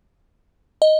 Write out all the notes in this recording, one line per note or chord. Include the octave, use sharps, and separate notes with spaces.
D#5